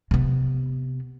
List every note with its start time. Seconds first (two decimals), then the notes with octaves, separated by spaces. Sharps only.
0.11 C3 B3